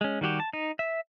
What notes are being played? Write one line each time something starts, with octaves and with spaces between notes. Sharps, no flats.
G#3 C#4
D#3 G3 F#4 G4
A5
D#4
E5